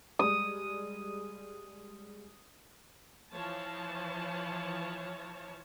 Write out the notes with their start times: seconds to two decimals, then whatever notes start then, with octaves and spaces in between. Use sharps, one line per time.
0.19 G3 G#3 D#6
3.31 E3 F3 C#5 A5